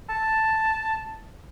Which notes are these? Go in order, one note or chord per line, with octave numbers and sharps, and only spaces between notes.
A5